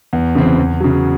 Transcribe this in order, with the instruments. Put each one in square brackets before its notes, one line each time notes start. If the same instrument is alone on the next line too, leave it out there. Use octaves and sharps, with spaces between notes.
[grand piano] E2
C#3 E3 C4
E2
C#3 F#3